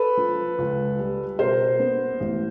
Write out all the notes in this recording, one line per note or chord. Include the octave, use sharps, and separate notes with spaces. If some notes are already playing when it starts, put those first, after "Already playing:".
Already playing: A4 B4
F3
C#2
G3
B2 A#4 C5
B3
A1